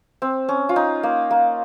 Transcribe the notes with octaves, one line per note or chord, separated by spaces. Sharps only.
C4
C#4
F4
D#4
A#3
A#3